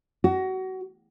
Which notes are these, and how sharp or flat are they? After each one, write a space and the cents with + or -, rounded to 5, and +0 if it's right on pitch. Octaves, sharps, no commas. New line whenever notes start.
F#4 +25